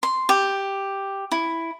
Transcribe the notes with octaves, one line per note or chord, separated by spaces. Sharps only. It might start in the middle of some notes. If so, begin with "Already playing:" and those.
C6
G4
E4